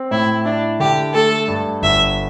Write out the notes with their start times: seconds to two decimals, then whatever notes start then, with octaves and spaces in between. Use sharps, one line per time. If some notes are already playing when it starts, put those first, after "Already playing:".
Already playing: C4
0.11 A2 E4
0.45 D4 E4
0.80 D3 G4
1.14 A3 A4
1.48 G2
1.82 G1 E5